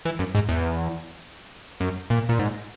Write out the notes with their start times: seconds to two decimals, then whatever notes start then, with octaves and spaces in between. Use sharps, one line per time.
0.05 E3
0.19 F#2
0.35 G#2
0.49 E2
1.80 F#2
2.10 A#2
2.29 A#2
2.39 G#2